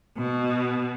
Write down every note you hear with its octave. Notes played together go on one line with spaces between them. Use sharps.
B2